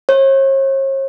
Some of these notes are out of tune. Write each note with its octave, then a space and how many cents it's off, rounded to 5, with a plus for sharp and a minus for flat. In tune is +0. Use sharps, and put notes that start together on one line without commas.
C#5 -45